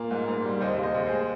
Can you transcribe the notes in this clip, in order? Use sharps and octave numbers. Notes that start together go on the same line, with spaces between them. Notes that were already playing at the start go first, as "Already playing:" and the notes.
Already playing: A#2 A#3
G#2
G#2
G3
D#2 C5 D#5
D#2
C5 D#5
D#2
G#4 C5
G#3